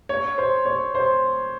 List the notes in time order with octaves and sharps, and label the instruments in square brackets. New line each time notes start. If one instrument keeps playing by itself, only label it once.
[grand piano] C#5
C5
C#5
C5